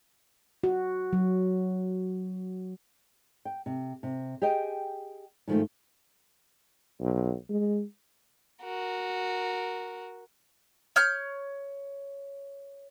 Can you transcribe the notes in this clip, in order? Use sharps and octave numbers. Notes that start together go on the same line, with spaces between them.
F#4
F#3
G5
C3
C3
G4 G#4 D#5 G5 G#5
G#2 D#3 F3 G3 A3
B1
G#3
F#4 A#4
C#5 F6 G6